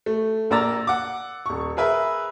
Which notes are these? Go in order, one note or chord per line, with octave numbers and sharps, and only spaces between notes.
A3
A#1 A#3 D5 A#5 E6 A6
F#5 D6
D#1 C#6
G#4 A#4 B4 E5